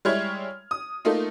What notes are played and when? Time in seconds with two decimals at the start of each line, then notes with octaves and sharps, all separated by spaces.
0.05 G3 G#3 E4 C#5 F6 G#6
0.71 D#6
1.05 A3 A#3 D#4 F4